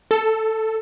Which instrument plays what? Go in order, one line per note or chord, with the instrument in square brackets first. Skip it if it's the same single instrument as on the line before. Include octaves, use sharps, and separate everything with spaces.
[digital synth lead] A4